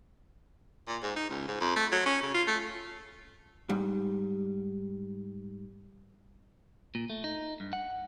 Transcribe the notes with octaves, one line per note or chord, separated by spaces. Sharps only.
A#2
G#2
D#4
C#2
G#2
F2
A3
F#3
C#4
C#3
F4
A3
G#2 G3
A#2
A3
D#4
G2
F#5